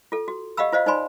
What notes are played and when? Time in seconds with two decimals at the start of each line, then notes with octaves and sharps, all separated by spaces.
0.12 F4 A4
0.28 F#4
0.57 G4 D#5 F5 F#5 B5 E6
0.72 F4 C5 D#5 F5
0.86 D#4 C5 D5 G#5 B5 C6